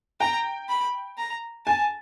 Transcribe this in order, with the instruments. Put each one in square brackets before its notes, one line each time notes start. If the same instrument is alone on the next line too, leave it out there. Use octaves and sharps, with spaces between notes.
[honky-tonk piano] G5 [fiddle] A#5
[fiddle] B5
A#5
[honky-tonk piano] G#5 [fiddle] A5